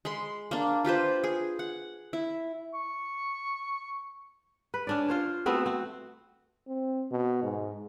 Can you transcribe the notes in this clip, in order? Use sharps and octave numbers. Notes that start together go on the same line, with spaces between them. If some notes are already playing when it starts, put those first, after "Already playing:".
G#3 B5 C6
A#3 D4
F4 G4 B4 C5
G#4
F#5
E4
C#6
B4
C#4 D4 D5
F4 C5 C#5
A3 B3 C4 F#4
C4 F#4
C4
B2
G#2